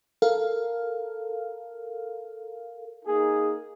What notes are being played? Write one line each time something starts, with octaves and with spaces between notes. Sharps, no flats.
A4 A#4 F5
A#3 D#4 G#4